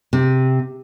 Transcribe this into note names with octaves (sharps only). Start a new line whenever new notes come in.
C3